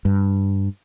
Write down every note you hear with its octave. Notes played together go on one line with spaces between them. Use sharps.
G2